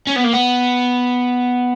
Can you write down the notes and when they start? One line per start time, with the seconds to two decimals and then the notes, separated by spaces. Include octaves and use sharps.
0.07 C#4
0.16 B3
0.24 A#3
0.33 B3